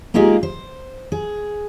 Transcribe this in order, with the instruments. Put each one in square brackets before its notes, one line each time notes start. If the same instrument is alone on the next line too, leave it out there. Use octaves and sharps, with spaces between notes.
[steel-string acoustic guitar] G#3 A#3 D#4 F4 G4 G#4
C5
G#4